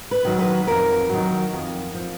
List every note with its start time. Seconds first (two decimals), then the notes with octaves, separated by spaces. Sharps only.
0.11 B4
0.25 D#3 F#3
0.39 B4
0.67 F2 A#4
1.10 D#3 F#3
1.53 F2
1.95 F3